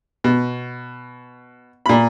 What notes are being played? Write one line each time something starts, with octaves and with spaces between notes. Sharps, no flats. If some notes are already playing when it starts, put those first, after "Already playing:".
B2
A#2 B5